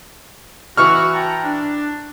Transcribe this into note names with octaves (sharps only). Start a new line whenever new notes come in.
E3 F#4 C#6 F6
G5 A5 A#5
D4